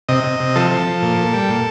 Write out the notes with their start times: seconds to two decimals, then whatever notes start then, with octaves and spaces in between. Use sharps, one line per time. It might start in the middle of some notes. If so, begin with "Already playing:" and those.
0.09 C3 D#5
0.24 C3
0.40 C3
0.56 F3 A4
0.71 F3
0.87 F3
1.02 A#2
1.17 A#2
1.34 G3
1.49 A#2